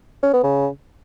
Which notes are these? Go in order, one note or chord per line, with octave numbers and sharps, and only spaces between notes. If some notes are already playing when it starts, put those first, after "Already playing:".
C#4
B3
C#3